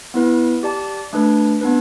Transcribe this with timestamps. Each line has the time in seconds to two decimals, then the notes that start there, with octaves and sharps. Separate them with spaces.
0.14 B3 E4 B4
0.63 G4 D5 A5
1.13 A3 D4 B4
1.61 B3 D4 B4